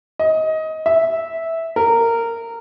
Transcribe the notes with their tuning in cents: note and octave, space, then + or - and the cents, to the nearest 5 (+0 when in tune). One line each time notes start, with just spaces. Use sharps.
D#5 +20
E5 -10
A#4 -15